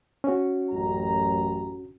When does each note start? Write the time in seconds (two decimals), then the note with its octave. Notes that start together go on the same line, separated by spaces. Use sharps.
0.24 C#4 F#4
0.71 A1 F#2 A#5